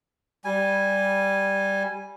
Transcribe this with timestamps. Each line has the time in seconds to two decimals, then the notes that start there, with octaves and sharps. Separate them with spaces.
0.45 G3 G#5